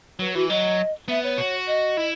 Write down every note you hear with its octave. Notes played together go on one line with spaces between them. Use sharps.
F#3 B4
E3 F#4
F#3 D#5
B3 E5
C#5
F#4
D#5
E4